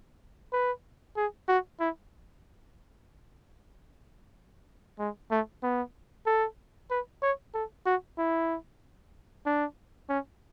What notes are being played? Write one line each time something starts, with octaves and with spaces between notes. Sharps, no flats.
B4
G#4
F#4
E4
G#3
A3
B3
A4
B4
C#5
A4
F#4
E4
D4
C#4